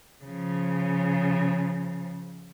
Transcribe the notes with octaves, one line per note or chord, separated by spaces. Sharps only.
C#3 F3